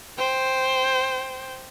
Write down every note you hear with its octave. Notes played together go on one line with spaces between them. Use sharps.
C5 G5